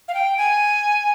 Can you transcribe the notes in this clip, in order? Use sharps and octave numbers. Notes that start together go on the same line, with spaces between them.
F5
G5
G#5